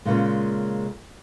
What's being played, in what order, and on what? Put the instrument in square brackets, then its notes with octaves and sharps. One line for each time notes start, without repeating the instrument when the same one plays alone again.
[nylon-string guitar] A#2 C#3 G#3